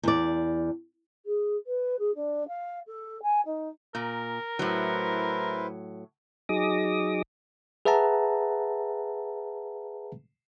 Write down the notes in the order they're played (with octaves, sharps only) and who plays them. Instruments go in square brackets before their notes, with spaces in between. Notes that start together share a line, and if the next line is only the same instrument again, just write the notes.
[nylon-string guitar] E2 D5
[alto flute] G#4
B4
G#4
D4
F5
A4
G#5
D#4
[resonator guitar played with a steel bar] A#2 [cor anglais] A#4
[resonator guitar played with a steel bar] A2 F#3 [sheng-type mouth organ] E4 B4 C5
[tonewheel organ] F#3 D#4 G#4 D6 D#6 A#6
[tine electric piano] G#4 B4 E5 F#5 A5 A#5